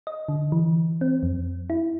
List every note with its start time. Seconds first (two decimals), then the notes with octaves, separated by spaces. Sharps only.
0.07 D#5
0.28 D3
0.52 E3
1.01 C4
1.23 F2
1.70 E4